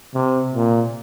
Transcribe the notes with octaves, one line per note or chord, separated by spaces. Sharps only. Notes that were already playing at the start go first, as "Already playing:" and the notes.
C3
A#2